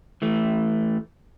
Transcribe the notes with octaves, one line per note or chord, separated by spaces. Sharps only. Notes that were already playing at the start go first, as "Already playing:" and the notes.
E3 A3